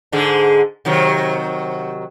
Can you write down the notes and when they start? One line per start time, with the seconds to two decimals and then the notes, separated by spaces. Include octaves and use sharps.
0.12 G#2 D3 G#3
0.85 C3 D#3 F#3